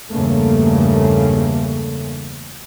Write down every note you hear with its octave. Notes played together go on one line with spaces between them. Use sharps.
E2 G2 C#3 A3 A#3